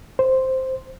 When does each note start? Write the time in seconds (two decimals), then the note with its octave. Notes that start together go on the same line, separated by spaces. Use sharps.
0.19 C5